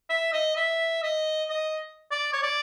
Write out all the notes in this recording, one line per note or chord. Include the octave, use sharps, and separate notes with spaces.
E5
D#5
E5
D#5
D#5
D5
C#5
D5